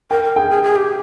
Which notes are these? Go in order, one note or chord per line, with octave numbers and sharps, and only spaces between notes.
A#4 G5
A#4
G#4 G5
G#4
G#4
G4